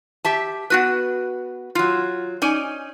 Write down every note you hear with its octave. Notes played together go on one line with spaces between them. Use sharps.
G4 E5 A5
B3 F#4 B4
F#3 F4
C#4 D#4 D5 G#5